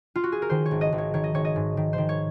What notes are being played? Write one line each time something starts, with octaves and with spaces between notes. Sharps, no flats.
F4
F#4
G#4
A#4
D#3 C5
C#5
G#1
D#5
G#1
C#5
D#3 C#5
D#5
G#1 C#5
D#5
G#2
D#3
C5
D#3
C#5